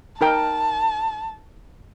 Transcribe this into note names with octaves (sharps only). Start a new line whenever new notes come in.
D#4 A#4 G5 A5